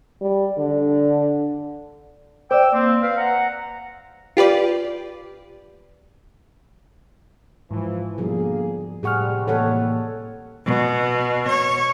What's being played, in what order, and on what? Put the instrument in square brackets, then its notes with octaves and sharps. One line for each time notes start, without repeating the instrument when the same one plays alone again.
[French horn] G3
D3
[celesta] C5 D5 [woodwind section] G5 D6 E6
[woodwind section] A#3 C4
B4 F5
F#5 A#5
[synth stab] F4 G4 B4 D5
[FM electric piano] G#2 [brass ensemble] E3 F3
[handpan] B2 F3 G3 [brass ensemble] D3 A#3 G#4
[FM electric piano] A2 C#6 F6 [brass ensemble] C3 G3 [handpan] G4 G#4 F#5
[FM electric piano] A2 E3 A#3 [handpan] A4 C#5 F#5
[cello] B2
C#5